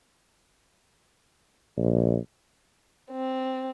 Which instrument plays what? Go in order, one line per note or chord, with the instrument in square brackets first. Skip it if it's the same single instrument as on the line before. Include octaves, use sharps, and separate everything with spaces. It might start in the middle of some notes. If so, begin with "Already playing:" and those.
[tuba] A#1
[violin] C4